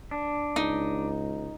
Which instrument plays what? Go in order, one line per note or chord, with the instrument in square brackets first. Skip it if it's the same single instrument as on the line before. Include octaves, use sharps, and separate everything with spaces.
[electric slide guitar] D4
[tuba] C#2 [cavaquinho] D#4